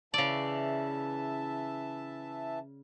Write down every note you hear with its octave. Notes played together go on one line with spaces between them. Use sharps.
C#3 E3 D5 E5 A5